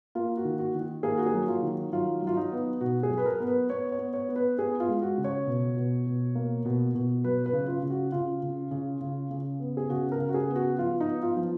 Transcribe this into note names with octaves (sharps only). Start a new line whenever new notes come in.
A#3 F4
F#4
D#3
F#4
D#3
A#3 G#4
F#4
G#4
F#3
F4
D#3
F#3 F4
F#3 F4
D#4
B3
B2 F#4
G#4
F#3
B4
A#4
B3
B4
B3 C#5
C#5
B3
C#5
B3
B4
B3 G#4
F4
G#3
F#4
C#3
C#5
B2
B2
B2
A#3
B2
B2
F#3 B4
B4
C#3
F4
C#3
F#4
C#3 F4
C#3
C#3
C#3
C#3
B3
G#4
C#3 F#4
A#4
C#3
F#4
G#4
B3
F#4
F3 F4
D#4
B3
F4
F3